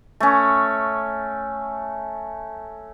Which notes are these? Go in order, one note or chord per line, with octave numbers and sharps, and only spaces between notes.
A3 C#4